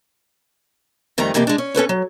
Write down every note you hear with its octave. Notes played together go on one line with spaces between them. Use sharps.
F2 D#3 G3 A3 D#4 A#5
F2 C3 E3 A#3 G4
G#3 D4
C#4
C#4 A4 B4 C#5
F#3